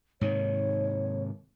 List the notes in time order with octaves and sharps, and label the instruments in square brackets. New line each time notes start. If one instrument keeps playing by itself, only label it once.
[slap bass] G#2 C3 D#3 [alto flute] C#5